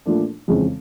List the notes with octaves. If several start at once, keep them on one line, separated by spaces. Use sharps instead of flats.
A#2 F3 A3 D4
F2 C#3 E3 G#3 C4